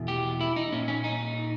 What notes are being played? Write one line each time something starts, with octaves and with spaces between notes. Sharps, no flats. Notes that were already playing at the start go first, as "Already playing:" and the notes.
Already playing: E2 B2
G4
E4
D#4
A#2 C#4
C#4
D#4